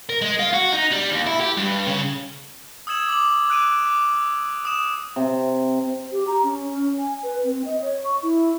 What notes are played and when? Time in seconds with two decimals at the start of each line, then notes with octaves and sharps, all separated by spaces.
0.09 A#4
0.21 G#3
0.39 F4
0.53 F#4
0.73 D#4
0.92 G3
1.11 D#2
1.26 E4
1.41 G4
1.57 G2
1.87 C#3
2.87 D#6 E6 G#6 E7 F#7
3.08 D6 F#7
3.49 D6 F#6 D7 D#7
3.86 D6
4.65 D#6 E7
5.16 C3
6.12 G4
6.27 A#5
6.43 C#4
6.99 G#5
7.23 B4
7.44 C4
7.65 D#5
7.82 C#5
8.04 C#6
8.23 E4